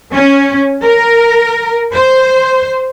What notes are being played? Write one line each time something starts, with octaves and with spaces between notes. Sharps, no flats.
C#4
A#4
C5